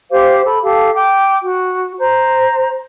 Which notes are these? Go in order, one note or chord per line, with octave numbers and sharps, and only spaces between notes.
G4 C5 F5 D6
A4 B5
G4 A4 F5
G5 D6
F#4
C5 A#5